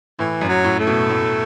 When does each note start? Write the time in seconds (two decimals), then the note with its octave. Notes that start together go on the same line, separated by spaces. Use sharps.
0.19 A2 E3
0.41 F#2
0.49 F#3
0.64 A2
0.80 A3
0.87 B2
1.09 A2